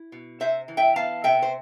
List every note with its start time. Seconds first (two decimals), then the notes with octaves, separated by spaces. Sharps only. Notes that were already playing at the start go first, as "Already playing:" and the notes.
Already playing: E4
0.12 B2
0.40 C3 C5 E5
0.68 E3
0.77 E5 G5
0.96 B3 F5 A5
1.24 C3 E5 G5
1.42 C5